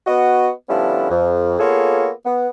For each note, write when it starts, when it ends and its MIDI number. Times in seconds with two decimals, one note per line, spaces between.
0.07 0.50 59
0.07 0.50 66
0.07 0.50 75
0.69 1.07 50
0.69 1.07 53
0.69 1.07 55
0.69 1.07 59
0.69 1.07 61
0.69 1.07 64
1.10 1.57 41
1.59 2.10 58
1.59 2.10 59
1.59 2.10 65
1.59 2.10 68
1.59 2.10 69
1.59 2.10 73
2.25 2.48 59